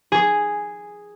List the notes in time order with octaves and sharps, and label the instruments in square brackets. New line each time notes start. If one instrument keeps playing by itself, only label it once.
[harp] G#4